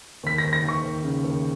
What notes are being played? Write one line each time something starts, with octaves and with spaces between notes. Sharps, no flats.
D#2 B6
D#2 A#6
A#6
D#2
C#6
D#2
C#3
D#2